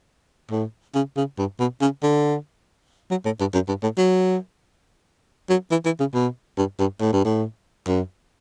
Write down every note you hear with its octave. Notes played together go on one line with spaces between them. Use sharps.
A2
C#3
C#3
G2
B2
C#3
D3
F#3
A2
G2
F#2
G2
A2
F#3
F#3
E3
E3
C#3
B2
G2
G2
A2
G2
A2
F#2